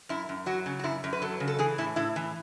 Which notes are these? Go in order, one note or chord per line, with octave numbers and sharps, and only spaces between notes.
F#2 E4
F#2
F#3 F#4
C#3
F#4
F#2 E4
F#2
B4
F#3 A4
C#3
A4
E3 G#4
A2 E4
A2 E4
E3